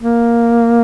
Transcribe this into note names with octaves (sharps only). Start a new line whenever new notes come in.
A#3